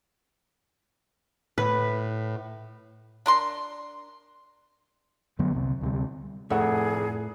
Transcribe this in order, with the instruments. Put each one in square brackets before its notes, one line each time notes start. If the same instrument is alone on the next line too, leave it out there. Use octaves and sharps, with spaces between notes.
[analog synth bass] A2 [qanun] B4
[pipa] D4 A#4 C6
[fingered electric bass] F2 D3 F#3 B3
C2 C3
D2 C3 G3
[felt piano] F1 F#5 [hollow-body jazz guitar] A2 A3 [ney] G#4